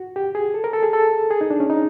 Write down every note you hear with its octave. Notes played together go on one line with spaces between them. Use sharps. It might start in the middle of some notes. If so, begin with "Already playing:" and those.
Already playing: F#4
G4
G#4
A4
A#4
A4
G#4
A4
G#4
D#4
D4
C#4
D#4